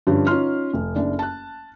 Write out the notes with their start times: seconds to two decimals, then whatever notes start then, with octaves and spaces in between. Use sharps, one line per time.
0.07 G2 D3 F3 G3 C#4
0.27 C#4 D#4 F4 C6 F6
0.73 F1
0.96 F#1 D4
1.19 A5 F#6